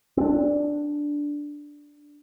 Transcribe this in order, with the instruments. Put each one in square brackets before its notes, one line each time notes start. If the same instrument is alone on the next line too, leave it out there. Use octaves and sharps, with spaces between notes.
[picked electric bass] C4 D4